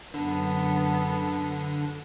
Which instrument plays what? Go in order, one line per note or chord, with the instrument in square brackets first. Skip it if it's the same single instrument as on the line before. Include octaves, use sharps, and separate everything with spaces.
[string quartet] F#2 B3 A4 [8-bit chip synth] D3